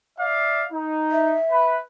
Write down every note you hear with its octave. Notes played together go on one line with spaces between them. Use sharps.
D5 E5 F5
D#4
E5
B4